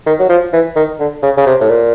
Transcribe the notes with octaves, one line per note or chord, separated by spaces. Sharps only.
D#3
F#3
F3
E3
D#3
D3
C#3
C#3
C3
A2
A#2